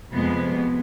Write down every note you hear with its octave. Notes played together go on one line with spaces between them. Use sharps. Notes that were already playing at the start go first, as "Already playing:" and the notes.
F2 C3 G#3 B3